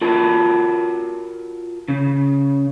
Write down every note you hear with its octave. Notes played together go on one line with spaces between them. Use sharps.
F4 F#4 A#4 A5
C#3